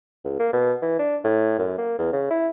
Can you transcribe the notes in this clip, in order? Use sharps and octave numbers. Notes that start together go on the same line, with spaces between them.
C#2
A#3
B2
E3
D4
A2
F#2
A#3
E2
C#3
E4